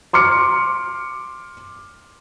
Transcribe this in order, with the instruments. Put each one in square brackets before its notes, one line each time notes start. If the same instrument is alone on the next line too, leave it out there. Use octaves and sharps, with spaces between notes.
[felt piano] C6 D6 F6 C#7